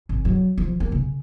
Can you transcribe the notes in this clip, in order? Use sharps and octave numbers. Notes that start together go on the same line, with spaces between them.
G#1
F#3
F3
A#3
C#3